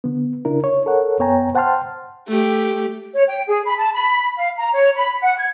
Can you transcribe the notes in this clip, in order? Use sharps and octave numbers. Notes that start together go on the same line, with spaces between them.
D3 B3
C#3 D4 E4 A#4
C#5
A4 A#4 C#5 F#5
F#2 B3 C#5 G5 G#5 A#5
C5 F#5 G5 A5 C6 F6
A3 G4
C#5
G5
G#4
B5
A5
B5
F5
A#5
C#5
B5
F#5
G#6